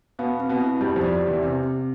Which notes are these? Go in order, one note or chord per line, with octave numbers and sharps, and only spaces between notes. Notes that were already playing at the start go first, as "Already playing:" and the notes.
B2 B3 F5
C4
B2 B3
E4
G2 G3 G4
F2 F3
D5
G4
E2 E3
C3 C4
C4